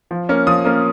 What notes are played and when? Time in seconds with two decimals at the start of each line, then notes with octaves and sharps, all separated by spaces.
0.11 F3
0.29 A#3 C#4
0.47 F3 D#6
0.65 A#3 C#4